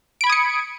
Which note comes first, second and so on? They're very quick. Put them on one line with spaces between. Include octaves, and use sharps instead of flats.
D7 B5 G#6 D#6 C#7